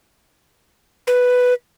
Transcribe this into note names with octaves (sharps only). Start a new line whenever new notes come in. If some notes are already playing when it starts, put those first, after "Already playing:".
B4